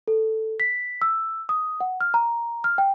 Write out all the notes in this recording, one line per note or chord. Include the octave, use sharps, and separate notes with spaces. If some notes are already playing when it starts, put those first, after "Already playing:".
A4
B6
E6
D#6
F#5
F6
A#5
F6
G5